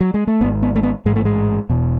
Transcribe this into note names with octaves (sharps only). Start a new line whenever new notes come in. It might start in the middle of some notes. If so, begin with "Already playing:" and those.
F#3
G#3
A3
G#1 G#2 B3
B3
A3
B3
A1 G#2 G#3
A3
G#3
E1 E2 B2